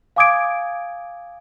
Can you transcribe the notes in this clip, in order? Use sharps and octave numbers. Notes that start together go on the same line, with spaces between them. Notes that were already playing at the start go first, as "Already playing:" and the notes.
F5 G#5 D6 D#6 G#6 D7